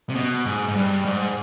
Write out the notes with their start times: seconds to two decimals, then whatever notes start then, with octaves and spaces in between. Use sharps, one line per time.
0.10 C3
0.15 B2
0.46 G#2
0.68 G#2
0.76 G2
1.05 G#2